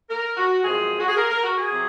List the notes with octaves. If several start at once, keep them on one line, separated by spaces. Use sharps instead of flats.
A#4
F#4
F#2 F3 G#3 C4 G#4
F#4
G#4
A#4
A#4
F#4
G#4
C3 F#3 C4